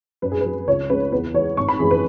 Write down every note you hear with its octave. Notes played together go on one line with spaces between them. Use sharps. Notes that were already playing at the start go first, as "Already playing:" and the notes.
F#2 B4
G#4
B4
F#3
C#2 C#5
C#3 G#3 B4
E2 B4
E3 G#3 C#5
G#1 C#6
B5
F#2 E3 G#3 G#4
B4